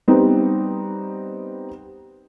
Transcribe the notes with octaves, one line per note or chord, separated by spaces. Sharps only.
G3 B3 C4 D#4